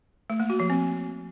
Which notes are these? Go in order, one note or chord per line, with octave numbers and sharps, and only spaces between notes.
A3
A#3
F#4
F3
C4